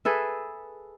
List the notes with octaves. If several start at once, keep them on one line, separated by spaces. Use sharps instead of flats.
G#4 A4 B4 E5